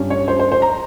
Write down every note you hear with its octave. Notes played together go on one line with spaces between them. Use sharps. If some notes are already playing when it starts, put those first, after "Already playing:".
Already playing: G2 G3 C#4
C#5
C5
C5
C5
A#5